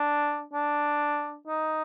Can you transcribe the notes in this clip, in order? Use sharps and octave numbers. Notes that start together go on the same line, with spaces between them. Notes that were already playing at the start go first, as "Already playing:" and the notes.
Already playing: D4
D4
D#4